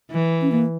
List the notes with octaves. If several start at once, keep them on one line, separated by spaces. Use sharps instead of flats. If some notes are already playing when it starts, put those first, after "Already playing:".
E3
C#4
A#3